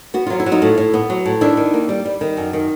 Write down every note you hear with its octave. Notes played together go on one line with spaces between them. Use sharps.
B3 F#4
F#3 F4
E4
F#3
D#4 F4
A2
A2
B3
F#3
A2
D#3 D4 E4
D#3
A#3
G3
G3
D#3
F#2
D#3